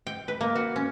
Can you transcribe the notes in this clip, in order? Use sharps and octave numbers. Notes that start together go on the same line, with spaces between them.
G5
B4
A#3
F#4
C#4